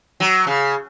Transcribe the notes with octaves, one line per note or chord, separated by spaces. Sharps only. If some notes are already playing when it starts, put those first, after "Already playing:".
F#3
C#3